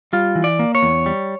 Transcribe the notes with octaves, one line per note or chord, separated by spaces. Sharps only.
G3 F4
E3
D5
A#3
C#5
E2
G3